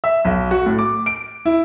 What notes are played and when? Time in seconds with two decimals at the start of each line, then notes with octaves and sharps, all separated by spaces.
0.04 E5
0.25 B1
0.51 F#4
0.66 A2
0.78 D6
1.06 D7
1.45 E4